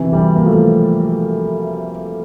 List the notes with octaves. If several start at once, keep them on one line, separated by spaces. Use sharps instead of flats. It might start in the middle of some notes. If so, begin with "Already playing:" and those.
Already playing: C3 E3
E3 G3
A#3
F3 A3